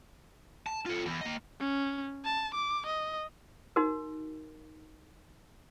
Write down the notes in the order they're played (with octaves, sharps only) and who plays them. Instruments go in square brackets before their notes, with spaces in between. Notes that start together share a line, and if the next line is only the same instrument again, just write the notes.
[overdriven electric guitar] A5
F4 A4
E2
A#3 D#5
[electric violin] C#4
A5
D6
D#5
[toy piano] D#4 F#4 A#4